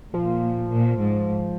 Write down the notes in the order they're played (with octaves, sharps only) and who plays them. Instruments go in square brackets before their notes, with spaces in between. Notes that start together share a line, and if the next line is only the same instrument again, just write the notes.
[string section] A#2 [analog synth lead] F3
[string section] A#2
G#2